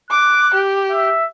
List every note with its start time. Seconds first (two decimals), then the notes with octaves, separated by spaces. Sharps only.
0.11 D6 F#6
0.54 G4
0.92 E5